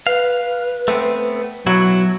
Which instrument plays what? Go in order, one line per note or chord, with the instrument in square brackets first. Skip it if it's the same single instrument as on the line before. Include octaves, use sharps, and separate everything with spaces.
[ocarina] B4 [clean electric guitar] F5
[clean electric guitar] A3 B3 C4
[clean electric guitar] B2 E4 F#4 [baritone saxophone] F#3